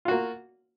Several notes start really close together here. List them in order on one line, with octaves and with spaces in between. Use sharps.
F4 F#4 A#3